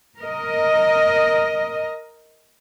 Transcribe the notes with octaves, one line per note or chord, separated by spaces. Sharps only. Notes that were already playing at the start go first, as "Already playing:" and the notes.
A#4 D#5